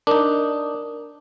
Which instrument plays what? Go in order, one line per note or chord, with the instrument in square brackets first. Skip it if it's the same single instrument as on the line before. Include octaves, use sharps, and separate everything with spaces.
[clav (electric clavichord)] D4 D#4 [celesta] A#4